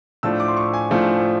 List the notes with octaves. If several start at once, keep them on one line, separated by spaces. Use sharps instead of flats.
A2 F3 A3 D4 E6
D6
C6
C#6
G#5
A2 F3 A3 D4